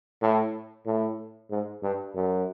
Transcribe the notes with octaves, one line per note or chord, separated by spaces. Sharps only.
A2
A2
G#2
G2
F#2